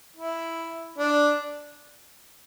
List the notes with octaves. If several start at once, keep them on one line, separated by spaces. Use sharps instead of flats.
E4
D4